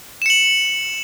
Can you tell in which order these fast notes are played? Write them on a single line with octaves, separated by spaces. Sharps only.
E7 C#7 F#7